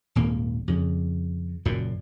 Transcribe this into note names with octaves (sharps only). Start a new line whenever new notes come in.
D#1 G#1 A#3
F2 C#3
F#1 F#2 A#2